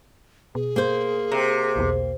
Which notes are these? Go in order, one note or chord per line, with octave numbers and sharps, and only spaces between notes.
B2 G#4
A#3 C5
C3 A#5
B1 E2 B2